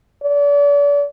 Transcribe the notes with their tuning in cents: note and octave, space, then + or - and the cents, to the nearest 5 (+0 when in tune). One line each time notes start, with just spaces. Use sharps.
D5 -40